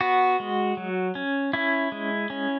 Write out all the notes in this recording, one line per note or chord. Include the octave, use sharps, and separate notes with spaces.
B3 F#4
G#3
F#3
C#4
C#4 E4
G#3
C#4